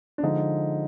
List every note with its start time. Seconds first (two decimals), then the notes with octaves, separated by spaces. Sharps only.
0.18 D4
0.23 D3 F3 G#3 D#4